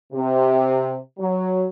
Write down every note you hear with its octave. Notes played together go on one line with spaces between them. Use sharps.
C3
F#3